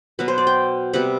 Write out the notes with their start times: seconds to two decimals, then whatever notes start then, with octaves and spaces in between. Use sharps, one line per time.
0.19 B2 F#3 B3 B4
0.28 C5
0.38 D5
0.47 G5
0.93 C3 G3 B3 F#5